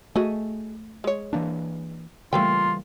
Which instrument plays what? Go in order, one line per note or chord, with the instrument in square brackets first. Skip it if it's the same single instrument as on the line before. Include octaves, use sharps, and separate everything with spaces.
[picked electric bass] A3 [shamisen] F#4 G#4 D#5
[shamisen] G#3 C#5
[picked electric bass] E3 A#3 D4
[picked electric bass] C#3 E3 G3 [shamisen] A3 A#3 G5 [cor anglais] F4